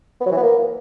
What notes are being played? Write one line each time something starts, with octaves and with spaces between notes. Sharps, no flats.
B3
F#3
E3
B3
A#3